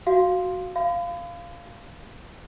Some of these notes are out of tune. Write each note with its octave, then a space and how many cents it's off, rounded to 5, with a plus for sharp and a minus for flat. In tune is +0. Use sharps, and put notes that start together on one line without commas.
F#4 +0 F5 +0
F5 -10 B5 +40